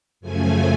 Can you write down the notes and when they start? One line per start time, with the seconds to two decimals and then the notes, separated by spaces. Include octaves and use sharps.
0.20 F#2 C#3 F3 A3 G#5